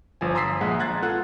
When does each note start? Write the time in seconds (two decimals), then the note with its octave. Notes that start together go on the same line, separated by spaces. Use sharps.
0.21 G1 F3 G#5
0.35 A#5 C6 D#6 E6 B6 C7
0.61 A#1 G#3 F#5
0.79 A#5 C6 F#6 G#6 A6
1.02 B3 F4 A4 F#5 F#6